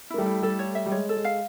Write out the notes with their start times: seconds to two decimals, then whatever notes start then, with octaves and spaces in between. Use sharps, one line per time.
0.10 A#3 E4
0.18 G3 A3
0.26 E4
0.42 G3 A3 A4
0.59 C#5
0.75 E5
0.86 G3
0.92 G#3 C#5
1.09 A4
1.16 G#3
1.24 F5